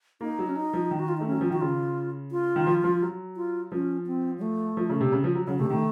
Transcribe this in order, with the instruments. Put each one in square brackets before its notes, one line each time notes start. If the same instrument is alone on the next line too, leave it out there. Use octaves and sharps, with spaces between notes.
[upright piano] A#3 [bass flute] D#4
[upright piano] F#3
[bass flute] C#4
D#4
[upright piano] F3
D#3
[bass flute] F#4
F4
[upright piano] A3 [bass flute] D#4
[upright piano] F#3 [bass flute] C#4
[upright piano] F3
[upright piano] D#3 [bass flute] F#4
[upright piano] C#3 [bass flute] F4
[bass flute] F4
[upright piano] D#3
F3
F3
F#3
[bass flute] F4
[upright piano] F3 [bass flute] C#4
[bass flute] C4
F#3
A3
[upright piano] F3
C#3
C3
C#3
F3
F#3
[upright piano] C#3 [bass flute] F#3
[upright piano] C3 [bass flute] A3
[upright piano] D#3 [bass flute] A3